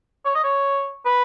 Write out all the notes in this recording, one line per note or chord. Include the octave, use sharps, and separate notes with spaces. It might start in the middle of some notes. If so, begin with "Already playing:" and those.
C#5
D#5
C#5
B4